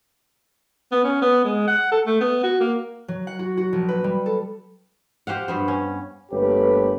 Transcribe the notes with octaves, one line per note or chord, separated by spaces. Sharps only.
B3
C#4
B3
G#3
F#5
A4
A3
B3
F#4
A#3
F#3
F#5
F#4
F#4
A#1
B4
G3
A4
G4 C5 F5 F#5
G2 B3 C5
C#4
G1 A3 A#3 G4 B4 C#5